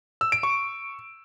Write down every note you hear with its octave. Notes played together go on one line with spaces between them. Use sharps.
E6
D7
C#6